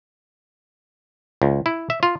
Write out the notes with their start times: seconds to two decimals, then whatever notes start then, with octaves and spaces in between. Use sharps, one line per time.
1.42 C#2
1.66 E4
1.90 E5
2.03 F4